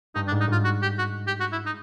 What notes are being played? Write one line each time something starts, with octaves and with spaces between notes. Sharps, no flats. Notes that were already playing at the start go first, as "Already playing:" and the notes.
G2 D#4
D4
G#2
D#4
G#2 F4
F#4
G4
F#4
G4
F#4
E4
D#4